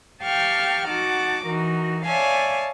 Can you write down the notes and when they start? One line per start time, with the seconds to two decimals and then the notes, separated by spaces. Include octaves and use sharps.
0.23 G4 F5 G5 A5 C#6 F6
0.88 D#4 F#4 F#5 A5 D6
1.46 E3 D#4 F#4 A#4
2.05 C#5 D5 E5 F5 G#5 A5